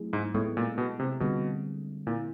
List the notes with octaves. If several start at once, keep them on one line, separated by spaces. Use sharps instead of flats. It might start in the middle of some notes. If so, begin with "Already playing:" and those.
Already playing: F#3 A3 C4 E4 G#4
G#2
A2 G#3 B3 E4 A4
A#2
B2
C3
B2 D3 G3 C4 F4 G#4
A#2 G3 C4 E4